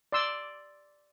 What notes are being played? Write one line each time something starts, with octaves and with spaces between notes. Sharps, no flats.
D5 C6 E6